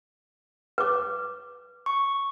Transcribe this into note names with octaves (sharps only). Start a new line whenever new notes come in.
B4 D6
C#6